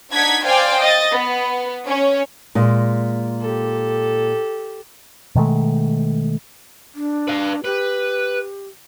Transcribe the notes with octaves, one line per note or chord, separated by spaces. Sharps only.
D4 D#4 F#5 G#6 B6
C5 D5 F5 G5 G#5
D#5 A6
B3
C#4 C#5
A#2 G#3
G4 A4
B2 D#3 G#3 A3
D4
B4 F5
G4 B4